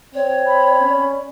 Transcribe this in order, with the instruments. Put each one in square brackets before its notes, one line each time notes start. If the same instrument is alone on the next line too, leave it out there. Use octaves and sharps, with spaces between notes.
[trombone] C4 [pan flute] C#5 [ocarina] D5
[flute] B5
[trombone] C#4